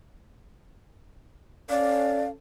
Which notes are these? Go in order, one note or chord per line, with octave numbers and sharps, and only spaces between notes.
C#4 A4 D5 F5